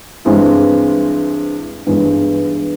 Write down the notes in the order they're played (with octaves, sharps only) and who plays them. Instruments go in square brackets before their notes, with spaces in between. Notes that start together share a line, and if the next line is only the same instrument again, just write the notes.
[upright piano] G2 E3 G#3 C4 E4
G2 E3 G#3 B3